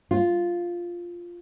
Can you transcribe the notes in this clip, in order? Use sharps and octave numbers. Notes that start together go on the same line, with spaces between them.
F4